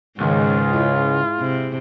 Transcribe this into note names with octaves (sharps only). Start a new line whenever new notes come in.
C#2 G#2 D#3 F4
E4 G#4
C3